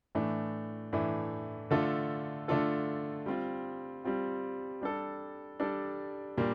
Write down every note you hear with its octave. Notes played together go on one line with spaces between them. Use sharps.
A2 E3 A3 D4
A2 E3 A3 D4
D3 A3 D4 F4 A4
D3 A3 D4 F4 A4
G3 C4 F4
G3 C4 F4
G3 D4 A4
G3 D4 A4
A#2 G3 A#3 D4